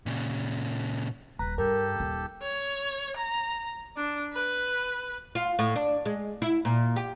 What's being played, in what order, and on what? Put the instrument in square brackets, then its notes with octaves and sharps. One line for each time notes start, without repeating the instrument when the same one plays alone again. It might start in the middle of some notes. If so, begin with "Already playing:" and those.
[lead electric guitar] A#2 C#3
[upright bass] D#1 [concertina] B4 [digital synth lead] A#5
[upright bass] G2 [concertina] G4 A4 [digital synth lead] A#4
[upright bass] D#1 D#4
[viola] C#5
A#5
D4
B4
[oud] F4
A2
D4
G#3
E4
A#2
G4